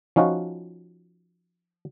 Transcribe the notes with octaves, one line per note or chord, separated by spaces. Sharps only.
F3 C#4 D#4 F4 F#4